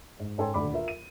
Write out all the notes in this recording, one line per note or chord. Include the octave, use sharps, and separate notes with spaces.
G#2
G#2 C#4 A4 G5 G#5 C6
D#1 D2 D5 B5 D6
F4 A#4 E5
D#7